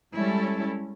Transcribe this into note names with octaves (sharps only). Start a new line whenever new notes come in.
G3 G#3 C#4 E4 A4